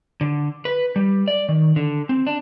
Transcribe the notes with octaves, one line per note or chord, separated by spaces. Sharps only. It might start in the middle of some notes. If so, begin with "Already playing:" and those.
D3
B4
G3
D5
D#3
D3
C4
D4